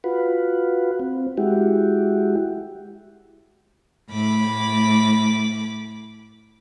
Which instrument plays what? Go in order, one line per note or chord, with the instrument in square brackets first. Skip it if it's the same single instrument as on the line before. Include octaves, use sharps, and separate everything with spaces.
[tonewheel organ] F4 F#4 B4
C4
G#3 E4 F#4 G4
[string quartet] A2 B5 D6